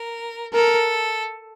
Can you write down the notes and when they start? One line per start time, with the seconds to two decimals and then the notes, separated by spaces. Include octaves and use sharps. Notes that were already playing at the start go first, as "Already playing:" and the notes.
Already playing: A#4
0.53 A4 A#4